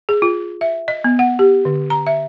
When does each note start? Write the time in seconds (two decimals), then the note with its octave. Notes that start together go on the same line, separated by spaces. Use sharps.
0.09 G#4
0.22 F4
0.61 E5
0.88 D#5
1.04 B3
1.19 F#5
1.39 G4
1.65 D3
1.90 A#5
2.07 E5